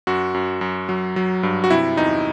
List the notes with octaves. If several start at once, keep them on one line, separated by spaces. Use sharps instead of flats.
F#2 F#4
F#2
F#2
F#3
F#3
G2
F#4
C3 E4
E2 D#4